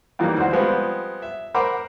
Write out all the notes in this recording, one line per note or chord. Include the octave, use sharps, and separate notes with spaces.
F2 D#3 E3 G3 A#3
D2 F#4 C5 F#5
F3 G3 G#3 B3 C4
E5
A#4 C5 F#5 B5 D6